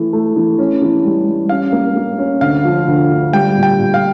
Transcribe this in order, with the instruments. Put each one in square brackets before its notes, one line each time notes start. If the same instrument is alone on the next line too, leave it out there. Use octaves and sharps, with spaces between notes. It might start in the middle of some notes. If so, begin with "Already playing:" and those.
Already playing: [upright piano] E3 A3
A3
E3
C#4
E3
G3
G3
[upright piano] C#4 [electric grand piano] F5
[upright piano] A#3
A#3
C#4
[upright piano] D2 [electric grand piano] F5
[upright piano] F3
D2
D2
[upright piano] G3 [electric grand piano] G5
[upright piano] A#2
[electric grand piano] G5
[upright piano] A#2
[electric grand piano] F5